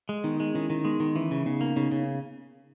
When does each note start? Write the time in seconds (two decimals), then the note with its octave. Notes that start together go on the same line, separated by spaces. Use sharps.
0.09 G#3
0.24 D#3 B3 D#4
0.40 G#3
0.54 D#3 C#4 E4
0.70 D#3
0.85 G#3 B3 D#4
1.00 D#3
1.15 E3 C#4 E4
1.31 C#3
1.46 C#3 B3 D#4
1.61 A#3
1.76 C#3 B3 D#4
1.92 C#3
1.99 C#4